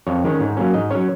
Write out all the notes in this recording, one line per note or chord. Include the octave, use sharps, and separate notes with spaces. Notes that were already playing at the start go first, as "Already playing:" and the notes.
F2 C#5
D#3 G#3 C#4 C#5
G#2
F#3 A#3 C#4
G#2 D#5
F#3 C#4 C#5